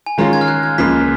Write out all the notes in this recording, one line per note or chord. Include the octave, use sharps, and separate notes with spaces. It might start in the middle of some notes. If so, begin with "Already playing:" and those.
G#5
D#3 G#3 C#4 F4 A#5
G#6
F6
F#6
G#6
C#2 C#3 F3 A#3 B6